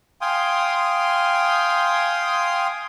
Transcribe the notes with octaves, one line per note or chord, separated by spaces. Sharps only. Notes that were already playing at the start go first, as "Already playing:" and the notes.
F5 G5 G#5 C6 D#6